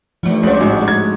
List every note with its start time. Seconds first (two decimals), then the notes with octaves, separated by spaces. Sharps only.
0.23 G2 E3 F3 A3 D#4
0.43 C#2 G3 C#4 D4 C5 D5
0.61 A1 G#2 F#4
0.87 G#2 G#6